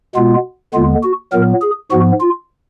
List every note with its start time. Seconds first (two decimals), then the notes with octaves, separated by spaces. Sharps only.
0.16 B2 G#3 B3 F4
0.74 D#2 D3 G#3 B3 F4
1.04 F#4
1.32 A#2 F#3 B3 A#4
1.62 G#4
1.91 G#2 F3 B3 F#4
2.20 F4